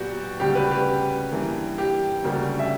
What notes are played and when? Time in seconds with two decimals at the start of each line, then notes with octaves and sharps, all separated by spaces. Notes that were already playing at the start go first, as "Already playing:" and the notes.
Already playing: A#2 F#3 B3 F#4 G4
0.40 D2 C#3 G3 G4
0.55 B4
0.71 G4
1.32 G2 E3 A#3
1.78 G4
2.24 D2 C#3 G3 A#3
2.59 E5